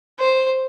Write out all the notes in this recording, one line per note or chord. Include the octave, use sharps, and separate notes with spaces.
C5